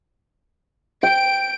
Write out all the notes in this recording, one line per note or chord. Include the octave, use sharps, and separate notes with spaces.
G5 D7